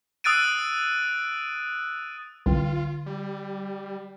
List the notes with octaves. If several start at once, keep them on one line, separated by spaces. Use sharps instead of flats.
D#6 E6 F#6 A6 D7 D#7
C2 D3 F4 G5
G3